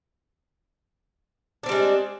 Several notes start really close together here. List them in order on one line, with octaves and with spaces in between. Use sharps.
D4 C4 G3 G#3